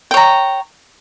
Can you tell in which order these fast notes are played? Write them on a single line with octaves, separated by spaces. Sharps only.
G5 C#5 A#5